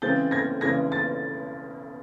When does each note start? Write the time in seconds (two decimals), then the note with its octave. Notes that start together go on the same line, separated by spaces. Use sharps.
0.02 C#3 E3 G#3 C4 G6 A6
0.31 G#6 A#6
0.61 C#3 E3 G#3 C4 G#6 A#6
0.92 A6